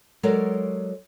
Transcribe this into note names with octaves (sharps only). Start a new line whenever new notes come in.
F#3 G#3 A4 A#4 C#5 D5